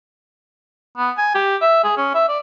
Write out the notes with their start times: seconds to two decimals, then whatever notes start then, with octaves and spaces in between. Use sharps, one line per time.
0.98 B3
1.18 G#5
1.35 G4
1.62 E5
1.84 G#4
1.97 C#4
2.14 E5
2.29 D5